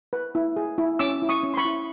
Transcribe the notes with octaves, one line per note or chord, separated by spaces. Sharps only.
B4
E4
G#4
E4
C#4 D6 E6
E4
C#6 D#6
C#4
C6
B5 C#6
E4